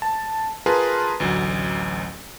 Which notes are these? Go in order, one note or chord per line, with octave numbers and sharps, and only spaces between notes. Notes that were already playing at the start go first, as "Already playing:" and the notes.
A5
F4 G#4 A#4 B4 A5 C6
A1 D2 F#3